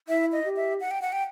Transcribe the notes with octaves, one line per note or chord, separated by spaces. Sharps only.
E4 E5
D#5
G4
E5
F#5
G5
F#5
G5